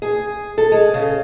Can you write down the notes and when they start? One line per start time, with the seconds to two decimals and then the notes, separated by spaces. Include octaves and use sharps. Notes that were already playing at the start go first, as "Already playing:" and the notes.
0.02 G#4
0.58 A4
0.72 G#3
0.94 C#3